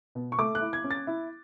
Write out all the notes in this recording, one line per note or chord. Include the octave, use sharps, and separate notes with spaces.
B2
C#6
A3 D6
F#6
E4
G#6
C#4
A6
E4